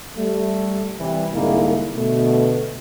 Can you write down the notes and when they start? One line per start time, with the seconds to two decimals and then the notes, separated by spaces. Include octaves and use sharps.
0.17 G3 A3
0.99 C3 E3 G3
1.34 C2 G#2 D3 G#3 A#3 E4
1.95 B2 D3 A3